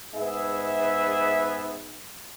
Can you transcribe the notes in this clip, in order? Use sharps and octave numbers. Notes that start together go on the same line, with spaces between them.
G#2 B3 G#4 E5